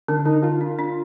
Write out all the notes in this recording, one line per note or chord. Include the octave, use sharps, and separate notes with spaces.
D3 D4
D3 D#4
D3 F4
D4
D4